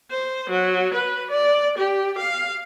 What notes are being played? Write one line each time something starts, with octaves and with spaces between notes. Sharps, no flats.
C5
F#3
B4
D5
G4
F5